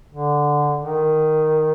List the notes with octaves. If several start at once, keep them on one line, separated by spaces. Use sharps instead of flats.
D3
D#3